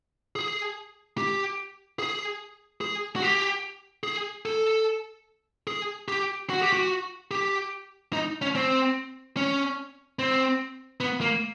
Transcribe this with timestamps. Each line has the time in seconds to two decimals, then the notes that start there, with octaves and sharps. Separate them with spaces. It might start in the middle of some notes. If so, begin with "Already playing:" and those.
0.36 G#4
1.18 G4
1.99 G#4
2.81 G#4
3.16 F#4
3.22 G4
4.03 G#4
4.45 A4
5.67 G#4
6.08 G4
6.50 F#4
6.61 G4
6.73 F#4
7.31 G4
8.13 D#4
8.42 C#4
8.55 C4
9.37 C#4
10.19 C4
11.00 B3
11.21 A#3